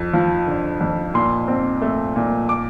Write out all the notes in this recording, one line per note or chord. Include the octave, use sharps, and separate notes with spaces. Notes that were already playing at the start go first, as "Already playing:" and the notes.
Already playing: F2
F3
D3
F2
A#2 C6
C4
A3
A#2
D6